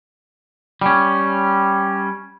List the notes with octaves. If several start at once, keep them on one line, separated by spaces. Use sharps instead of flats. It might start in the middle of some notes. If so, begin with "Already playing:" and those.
G3 C#4